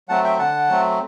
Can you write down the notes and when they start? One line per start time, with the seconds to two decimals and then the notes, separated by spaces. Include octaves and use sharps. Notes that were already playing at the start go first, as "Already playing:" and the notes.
0.09 F#3 A3 C4 F#5 A5
0.24 E5 G5
0.38 D3 F#5 A5
0.69 F#3 A3 C4